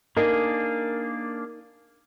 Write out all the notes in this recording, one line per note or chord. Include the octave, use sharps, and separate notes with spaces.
A#3 D4 D#4 G#4 A#4 D#5